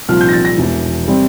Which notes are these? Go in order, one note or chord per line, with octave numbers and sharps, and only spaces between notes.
C2 A#2 F3 F6
G6
A#6
A6
A#6
E1 E2 E3
C3 G3 C4